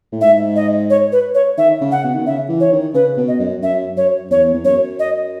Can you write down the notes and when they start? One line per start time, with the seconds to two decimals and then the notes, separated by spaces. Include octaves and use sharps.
0.13 A2
0.21 G#2 E5
0.56 D#5
0.90 C#5
1.12 B4
1.35 C#5
1.58 D#3 E5
1.81 C#3
1.92 F#5
2.04 B2
2.15 D#3
2.26 C#3 E5
2.49 E3
2.60 C#5
2.72 D#3
2.94 C#3 B4
3.17 B2
3.28 D#5
3.39 F#2
3.62 F#2 E5
3.97 F#2 C#5
4.30 E2 C#5
4.54 E2
4.65 F#2 C#5
4.99 D#5